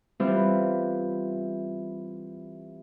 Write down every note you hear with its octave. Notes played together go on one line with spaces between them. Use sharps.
E3 G3 B3 C4 E4 F4